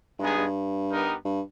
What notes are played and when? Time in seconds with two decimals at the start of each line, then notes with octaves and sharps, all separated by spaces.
0.19 G2 G#3 B3 D#4 G#4
0.37 G2
0.90 B3 D#4 G4 A#4
1.25 G2